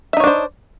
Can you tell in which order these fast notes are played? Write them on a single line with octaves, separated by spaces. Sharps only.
E5 D#4 C#5 D4 C5